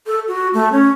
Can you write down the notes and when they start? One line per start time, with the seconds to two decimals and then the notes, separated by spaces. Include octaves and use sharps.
0.07 A4
0.28 F#4
0.54 A3
0.72 C#4